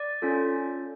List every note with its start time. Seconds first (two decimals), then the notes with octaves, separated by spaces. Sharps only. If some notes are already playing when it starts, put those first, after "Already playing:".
Already playing: D5
0.22 C#4 F4 A4